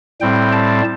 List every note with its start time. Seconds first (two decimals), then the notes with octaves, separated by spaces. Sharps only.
0.21 A2 G3 C4 G5
0.52 A5